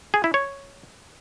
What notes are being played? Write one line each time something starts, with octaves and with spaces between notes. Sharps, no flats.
G#4
E4
C#5